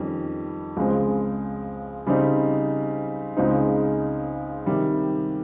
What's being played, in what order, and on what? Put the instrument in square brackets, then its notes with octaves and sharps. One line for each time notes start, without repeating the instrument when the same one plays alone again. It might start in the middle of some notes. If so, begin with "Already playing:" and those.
Already playing: [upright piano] F2 D#3 G3 C#4
C#2 C#3 G#3 C4
C#3 G3 C4 D#4
C#2 C#3 G#3 C4 D#4
C3 D#3 G3